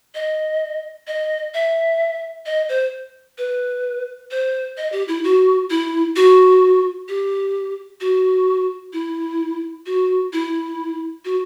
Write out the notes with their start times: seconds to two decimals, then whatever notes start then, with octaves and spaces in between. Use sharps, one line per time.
0.15 D#5
1.07 D#5
1.54 E5
2.46 D#5
2.69 C5
3.38 B4
4.31 C5
4.77 D#5
4.92 G4
5.08 E4
5.24 F#4
5.70 E4
6.16 F#4
7.09 G4
8.01 F#4
8.93 E4
9.86 F#4
10.33 E4
11.25 F#4